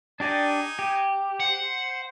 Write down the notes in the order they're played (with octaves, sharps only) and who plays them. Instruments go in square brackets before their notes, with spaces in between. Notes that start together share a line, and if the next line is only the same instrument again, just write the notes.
[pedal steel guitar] D4 G4 D5 [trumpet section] D#4 G#5
[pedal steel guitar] G4
[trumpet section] C5 [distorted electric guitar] F#5